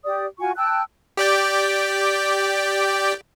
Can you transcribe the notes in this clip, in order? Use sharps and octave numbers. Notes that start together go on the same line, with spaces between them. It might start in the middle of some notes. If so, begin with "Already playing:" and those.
G4 D5 D#6
F4 F#4 G#5 C#6
G5 A5 E6 F#6
G4 D5 G5